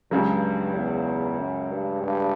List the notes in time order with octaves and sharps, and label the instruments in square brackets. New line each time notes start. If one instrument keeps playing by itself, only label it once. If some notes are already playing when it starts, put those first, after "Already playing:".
[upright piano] C#2 C#3 F#3 [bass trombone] G2
[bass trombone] E2
F#2
G2
G2